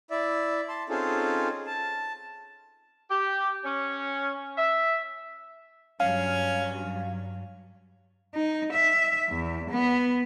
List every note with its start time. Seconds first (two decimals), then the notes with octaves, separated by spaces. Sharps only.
0.11 E4 D5 E5
0.68 A5 C6
0.89 C4 C#4 D#4 F4 G#4 A4
1.66 A5
3.11 G4
3.65 C#4
4.57 E5
6.00 G2 F#3 C#4 F5
8.35 D#4
8.72 E5
9.30 E2
9.70 B3